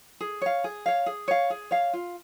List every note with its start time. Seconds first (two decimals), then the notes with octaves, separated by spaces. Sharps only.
0.20 G#4
0.41 C#5 F5
0.64 G#4
0.86 C#5 F5
1.06 G#4
1.28 C#5 F5
1.50 G#4
1.71 C#5 F5
1.93 F4